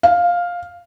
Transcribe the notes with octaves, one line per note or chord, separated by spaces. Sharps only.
F5